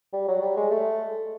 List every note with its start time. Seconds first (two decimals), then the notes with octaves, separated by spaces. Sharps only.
0.13 G3
0.28 F#3
0.42 G3
0.57 G#3
0.71 A3